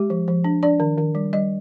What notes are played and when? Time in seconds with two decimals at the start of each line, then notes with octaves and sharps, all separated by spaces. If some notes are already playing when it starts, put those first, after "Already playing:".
Already playing: G#3 G4
0.10 F3
0.28 F3
0.44 D4
0.63 D4 D5
0.80 D#3
0.98 D#3
1.15 G3
1.33 G3 D#5